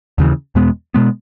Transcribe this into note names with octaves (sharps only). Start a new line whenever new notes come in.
D#2 C#3 E3
E2 B2 G#3 B3
B2 G#3 B3